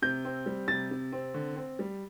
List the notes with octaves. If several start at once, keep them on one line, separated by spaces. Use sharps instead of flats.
C3 G6
C4
G3
C3 A6
C3
C4
D3
C4
G3